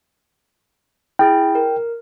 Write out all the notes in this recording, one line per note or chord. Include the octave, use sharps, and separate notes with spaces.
E4 G#4 G5
A#4